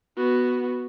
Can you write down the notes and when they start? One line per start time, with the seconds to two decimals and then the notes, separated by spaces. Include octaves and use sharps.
0.17 B3 F#4